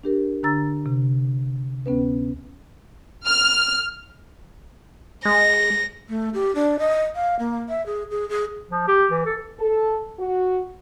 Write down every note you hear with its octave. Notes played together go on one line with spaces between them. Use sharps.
D4 G4 A#4
D3 D4 A#5 E6 A6
C3
D2 B3 C#4 B4
F6
G#3 A#6
A3
G4
D4
D#5
F5
A#3
E5
G#4
G#4
G#4
F3
G4
E3
A4
A4
F#4